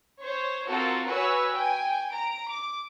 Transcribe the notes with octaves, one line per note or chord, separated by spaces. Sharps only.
C5 C#5
C4 F4 F#4 A4 A#4
F#4 B4 C#5 G#5 E6
G5 G#5
A#5 D7
D6